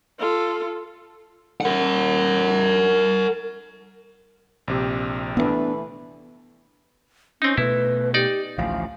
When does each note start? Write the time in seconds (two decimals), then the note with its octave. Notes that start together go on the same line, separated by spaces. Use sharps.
0.19 F4 A4
1.61 A#4 F#5
4.68 A#1 C3 G4
5.37 E3 A3 B3 C4 D4 B4
7.42 C4 C#4 D#4
7.57 B2 A3 E4 B4
8.14 D#4 G4 D5
8.58 A1 D2 F3 F5